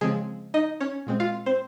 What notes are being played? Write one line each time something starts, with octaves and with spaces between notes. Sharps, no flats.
C#3 F3 G#3 C4 G#4
D#4 D#5
C#4 C#5
A#2 G#3 C4
F4 F5
C4 C5